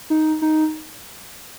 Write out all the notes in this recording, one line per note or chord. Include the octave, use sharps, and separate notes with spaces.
D#4
D#4